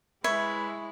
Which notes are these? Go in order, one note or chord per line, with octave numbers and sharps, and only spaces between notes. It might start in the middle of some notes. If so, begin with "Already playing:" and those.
G#3 E4 B4 C#5 E5 B5